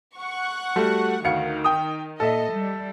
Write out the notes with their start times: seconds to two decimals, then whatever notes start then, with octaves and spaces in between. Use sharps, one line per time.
0.16 F#5 C#6
0.76 G3 A3 F#4
1.24 D2 D#3 F5 C#7
1.64 G5 D#6
2.20 A#2 A4 D#5 E5
2.53 G3